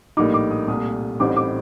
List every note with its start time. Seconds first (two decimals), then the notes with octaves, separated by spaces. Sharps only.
0.17 A#1 A2 G3 A#3 D#4 D6
0.34 D6
0.51 D#6
0.68 C2 A#2 A3 D#6
1.20 A1 A2 G3 C4 D#4 D6
1.37 D6